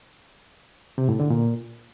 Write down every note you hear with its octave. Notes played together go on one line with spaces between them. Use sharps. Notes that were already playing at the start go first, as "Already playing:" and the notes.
C3
A2
D3
A#2